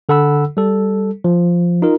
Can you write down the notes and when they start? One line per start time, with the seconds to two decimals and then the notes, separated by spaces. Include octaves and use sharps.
0.09 D3 A4 F#5 B5 E6
0.57 G3 A4
1.24 F3
1.82 D#4 F4 A#4